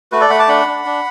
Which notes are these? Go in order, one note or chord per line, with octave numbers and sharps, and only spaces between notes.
A3 F#4 B4
A4 D5
A3 F#5 B5
A5 D6
D4 F#5 B5
D4
D4